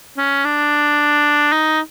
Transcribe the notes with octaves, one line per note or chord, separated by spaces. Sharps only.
C#4
D4
D#4